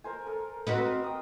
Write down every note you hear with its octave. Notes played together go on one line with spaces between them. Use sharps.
A#4 C5 G#5
A4 A#4
C4 F#4 A#4 B4 D#5
G5 D#6